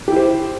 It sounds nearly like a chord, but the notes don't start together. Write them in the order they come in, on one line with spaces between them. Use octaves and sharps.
G4 E4 C5